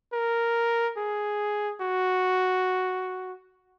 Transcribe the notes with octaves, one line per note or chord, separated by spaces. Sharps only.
A#4
G#4
F#4